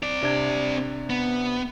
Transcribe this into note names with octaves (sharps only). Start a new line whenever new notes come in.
C4 D5
C3 D4 G#6
B3